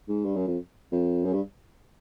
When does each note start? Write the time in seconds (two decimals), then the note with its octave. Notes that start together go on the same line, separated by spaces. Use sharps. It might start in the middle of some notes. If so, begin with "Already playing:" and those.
0.08 G#2
0.25 G2
0.36 F#2
0.47 F2
0.92 F2
1.25 F#2
1.33 G2